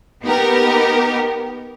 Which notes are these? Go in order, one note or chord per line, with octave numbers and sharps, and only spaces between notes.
B3 D#4 G4 A#4